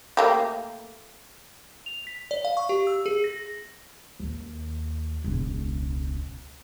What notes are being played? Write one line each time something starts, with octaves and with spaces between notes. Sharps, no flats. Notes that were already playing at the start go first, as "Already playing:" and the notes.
A3 A#3 G4
F7
B6
D5
F5
C#6
G4
E6
G#4
A#6
D#2
E1 C#2